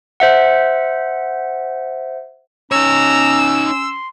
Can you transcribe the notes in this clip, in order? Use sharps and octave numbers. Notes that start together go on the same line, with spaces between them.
C5 E5 F#5
C#4 D#4 C#5 A#5 E6
C6